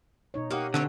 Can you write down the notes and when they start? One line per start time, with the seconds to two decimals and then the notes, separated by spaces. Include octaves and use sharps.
0.34 B2 D#4 C#5
0.50 A#3 D#4 F#4 G4 F#5
0.74 D3 A3 C4 C#5